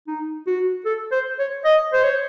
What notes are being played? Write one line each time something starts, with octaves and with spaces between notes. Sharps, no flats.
D#4
F#4
A4
C5
C#5
D#5
C5
C#5